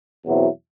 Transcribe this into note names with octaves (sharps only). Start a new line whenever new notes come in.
E2 B2 F#3 C4 E4